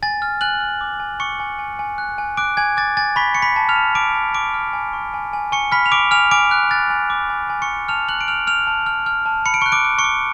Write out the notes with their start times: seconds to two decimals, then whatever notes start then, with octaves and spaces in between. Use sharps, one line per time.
0.03 G#5 A6
0.22 F6
0.41 G#5 F#6 F#7
0.61 F6
0.81 D6
1.00 G#5
1.20 C#6 D6 C#7
1.40 G#5
1.59 G#5
1.79 G#5
1.98 F#6
2.18 G#5
2.37 D6 F#6 D7
2.57 G#5 G#6
2.77 D6 A6
2.97 G#5 A6
3.16 B5 C#6 B6
3.35 C#6 C#7
3.42 B5 B6
3.56 A5
3.69 F6 F7
3.76 A5
3.95 A5 D6 D7
4.15 A5
4.34 C#6 D6 D7
4.54 F6
4.73 G#5
4.93 C#6
5.14 G#5
5.33 G#5
5.52 G#5 C#6 C#7
5.72 B5 F6 B6
5.86 F7
5.92 C#6 D6 D7
6.11 G#5 F6 F7
6.31 G#5 D6 D7
6.51 F#6
6.71 F#6 A6
6.90 G#5
7.10 D6
7.30 G#5
7.50 G#5
7.62 C#6 C#7
7.69 G#5
7.88 A5 F6 F7
8.09 F6 F#6 F#7
8.21 D7
8.28 F6 F7
8.47 F6 F7
8.67 A5
8.86 F6
9.06 F6
9.26 A5
9.46 B5 C#7
9.54 D7
9.61 C#6 F#6 C#7
9.72 D6 D7
9.85 D6
9.98 C#6 C#7
10.04 D6